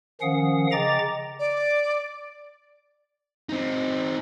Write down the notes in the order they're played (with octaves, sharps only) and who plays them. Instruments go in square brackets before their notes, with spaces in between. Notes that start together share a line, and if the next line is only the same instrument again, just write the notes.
[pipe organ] D#3 F3 C#4 F5 F#5 D#6
C#3 D#5 G5 A#5 D6 A6
[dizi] D5
[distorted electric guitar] C4 D#4